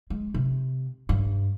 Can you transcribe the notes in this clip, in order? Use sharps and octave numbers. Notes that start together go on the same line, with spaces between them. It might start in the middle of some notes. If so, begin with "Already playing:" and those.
G#3
C3
G2